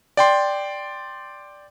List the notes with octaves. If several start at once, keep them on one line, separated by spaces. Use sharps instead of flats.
D5 G5 C6